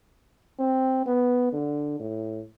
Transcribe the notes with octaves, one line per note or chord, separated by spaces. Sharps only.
C4
B3
D3
A2